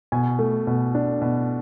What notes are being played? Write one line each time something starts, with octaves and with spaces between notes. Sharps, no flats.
B2 G#5
A3
B2
D4
B2